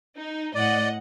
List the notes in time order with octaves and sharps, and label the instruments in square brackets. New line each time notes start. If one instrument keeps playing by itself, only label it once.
[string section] D#4
[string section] A2 D#5 F#5 [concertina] D5